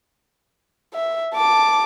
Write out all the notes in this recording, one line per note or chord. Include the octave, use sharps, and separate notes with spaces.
E5
A5 D6